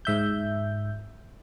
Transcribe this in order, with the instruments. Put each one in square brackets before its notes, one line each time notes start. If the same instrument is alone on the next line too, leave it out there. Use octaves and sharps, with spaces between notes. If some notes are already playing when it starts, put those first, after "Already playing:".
[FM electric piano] G#2 E5 G6